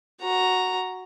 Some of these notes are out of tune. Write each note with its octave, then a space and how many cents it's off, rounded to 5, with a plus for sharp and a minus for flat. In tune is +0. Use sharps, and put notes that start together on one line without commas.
F#4 +0 A#5 +0